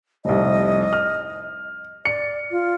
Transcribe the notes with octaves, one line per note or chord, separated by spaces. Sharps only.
F1 C2 D#5
F6
D5 C#7
F4